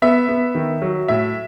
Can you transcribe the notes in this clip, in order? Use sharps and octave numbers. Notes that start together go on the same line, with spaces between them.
B3 E5
B3
D#3
F#3
A2 E5